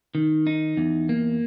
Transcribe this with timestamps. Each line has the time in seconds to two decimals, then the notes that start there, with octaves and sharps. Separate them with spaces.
0.15 D#3
0.47 D#4
0.77 E2
1.09 A#3